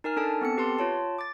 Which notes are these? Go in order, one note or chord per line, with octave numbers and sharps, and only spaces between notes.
D#4 A#4 G#5 F6
D4 A4 G#5 A5
B3 C4 A4 C#7
G4 B4 A5 C6
F4 C#5 A5
D6 A6